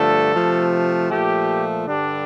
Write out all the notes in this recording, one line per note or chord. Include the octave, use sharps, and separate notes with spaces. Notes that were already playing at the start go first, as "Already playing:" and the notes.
Already playing: G2 D3 F3 A3 A4
C3 F3 A3
A#2 F3 A3 G4
G2 D3 G3 D4